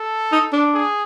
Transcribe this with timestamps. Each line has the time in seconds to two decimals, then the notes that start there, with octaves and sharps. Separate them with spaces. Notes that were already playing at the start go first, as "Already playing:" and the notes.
Already playing: A4
0.32 D#4
0.53 D4
0.74 G#4